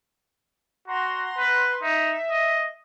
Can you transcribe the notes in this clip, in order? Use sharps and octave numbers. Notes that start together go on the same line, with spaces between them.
F#4 F#5 A#5 C6
B4
D#4 E5
D#5